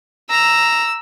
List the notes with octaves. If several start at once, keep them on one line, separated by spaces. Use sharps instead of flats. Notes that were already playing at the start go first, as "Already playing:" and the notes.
A#5 E6